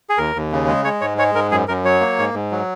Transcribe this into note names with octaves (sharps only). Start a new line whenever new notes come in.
G#4
D#2 A#4
D#2
C#3
G#3
G#3 C#5
G#2 C#5
G#3 C#5
G#2 A#4
F#2 G#4
F#2 A#4
F#3 C#5
A#3
G#2
G#2
F#3